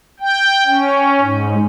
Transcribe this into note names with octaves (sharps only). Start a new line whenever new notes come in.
G5
C#4
G#2